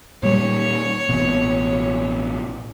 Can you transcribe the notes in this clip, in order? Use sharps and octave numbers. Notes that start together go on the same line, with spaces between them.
A#2 G3 C#5
A1 B2